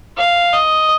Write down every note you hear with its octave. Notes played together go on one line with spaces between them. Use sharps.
F5
D#5